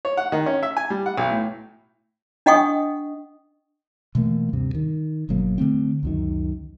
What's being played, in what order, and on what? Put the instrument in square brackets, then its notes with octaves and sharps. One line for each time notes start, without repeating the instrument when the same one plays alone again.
[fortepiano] C#5
F#5
D#3
C#4
E5
G#5
G3
F#5
B1
A2
[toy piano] D4 D#5 F#5 G5 C#6 D#6
[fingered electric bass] B2 E3 A3 A#3
D2 G2 C3
D#3
G1 B2 F#3 A#3
D3 F3 A3 C4
C#2 F#2 D#3